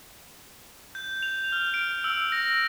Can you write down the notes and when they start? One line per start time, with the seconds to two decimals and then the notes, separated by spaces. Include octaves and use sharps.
0.95 G6
1.23 F7
1.52 F6
1.74 D7
2.04 E6
2.32 A#6